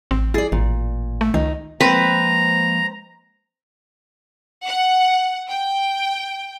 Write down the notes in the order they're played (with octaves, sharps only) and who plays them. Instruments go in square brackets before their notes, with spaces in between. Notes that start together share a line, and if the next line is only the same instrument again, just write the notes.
[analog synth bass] A1 [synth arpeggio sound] C4
[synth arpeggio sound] E4 A6 [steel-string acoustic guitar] G#4 D5
[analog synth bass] A1 [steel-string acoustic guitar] A#2
[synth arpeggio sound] A3
[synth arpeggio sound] C#2 D#3 [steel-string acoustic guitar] D#4
[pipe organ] F3 G#3 A#3 [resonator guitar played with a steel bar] C4 [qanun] B4 [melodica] A#5
[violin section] F#5
G5